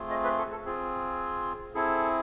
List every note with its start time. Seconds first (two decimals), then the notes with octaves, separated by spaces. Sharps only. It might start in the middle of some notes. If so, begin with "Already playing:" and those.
Already playing: A3 C4 F4 G#4
0.10 D#5
0.24 B4
0.39 A4
0.52 A4
0.65 C4 F4 G#4
1.75 C4 E4 G#4 A4